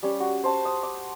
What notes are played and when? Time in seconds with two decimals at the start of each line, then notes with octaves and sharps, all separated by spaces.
0.03 G3 C#4
0.20 F#4
0.44 C5 A5 C#6
0.65 D#6
0.83 D6